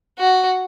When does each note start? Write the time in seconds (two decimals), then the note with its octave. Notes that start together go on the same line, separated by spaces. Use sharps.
0.19 F#4